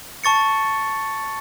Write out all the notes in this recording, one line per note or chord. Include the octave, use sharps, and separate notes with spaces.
A5 C#6 A6 C#7